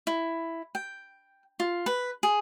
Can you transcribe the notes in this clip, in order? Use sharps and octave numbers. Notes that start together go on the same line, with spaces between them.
E4
G5
F4
B4
G#4